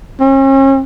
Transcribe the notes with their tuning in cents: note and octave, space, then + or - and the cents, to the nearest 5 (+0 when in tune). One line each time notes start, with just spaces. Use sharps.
C#4 -40